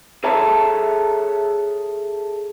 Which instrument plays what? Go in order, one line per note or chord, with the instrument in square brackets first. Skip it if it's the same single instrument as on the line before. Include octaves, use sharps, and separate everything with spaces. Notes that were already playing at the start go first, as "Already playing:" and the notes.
[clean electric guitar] G#4 A4 C#5 E5 A5 A#5